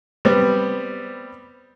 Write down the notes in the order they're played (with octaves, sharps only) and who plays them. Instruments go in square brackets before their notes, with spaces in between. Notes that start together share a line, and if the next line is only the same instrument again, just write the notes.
[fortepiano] G3 B3 C4